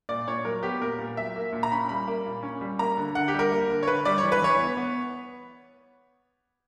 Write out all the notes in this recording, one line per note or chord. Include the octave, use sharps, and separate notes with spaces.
A#2 D5
A#2 C#5
F#3 A#4
B3 G4
A#2 A#4
A#2
F#3 E5
A#3
A#2
A#5
C#4 B5
G3 B5
A#3
A#2
C#4
G3
A#3 A#5
D3
D3 F#5
G4
G3
A#4
A#3
D3
C#5
D3 B4
G3 D5
C#5
E3
B4
E3 C#5
B3
B3